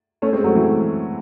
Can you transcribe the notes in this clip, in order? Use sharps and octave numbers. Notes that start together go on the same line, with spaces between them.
A3 C#4
G#3 C4
F#3 A3
E3 G#3